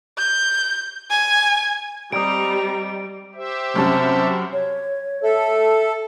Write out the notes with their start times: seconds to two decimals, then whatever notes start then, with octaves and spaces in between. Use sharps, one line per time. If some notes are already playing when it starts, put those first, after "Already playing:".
0.18 G6
1.10 G#5
2.12 G3 C4 G4 D5 D#5 A#5 D7
3.34 G4 C5 E5
3.76 F#2 C3 G3 C#4 F#5 G#5 A5
4.53 C#5
5.23 A4 E5